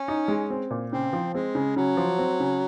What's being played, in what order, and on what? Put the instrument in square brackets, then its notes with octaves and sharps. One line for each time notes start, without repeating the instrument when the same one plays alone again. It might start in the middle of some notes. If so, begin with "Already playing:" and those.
Already playing: [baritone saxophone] C#4
[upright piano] D#4
G#3
C4
A#2
[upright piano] C#3 [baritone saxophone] C4
[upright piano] F3
[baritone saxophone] G#3 [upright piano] C4
[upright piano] C#3
[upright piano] C#3 [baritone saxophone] F#3
[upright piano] F3
C4
C#3